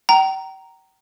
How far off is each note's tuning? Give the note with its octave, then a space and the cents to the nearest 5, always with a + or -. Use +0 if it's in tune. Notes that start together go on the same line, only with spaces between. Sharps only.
G5 -35 A#5 +0